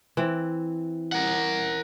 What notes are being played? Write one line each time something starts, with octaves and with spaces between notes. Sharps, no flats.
E3 C4
A#4 F#5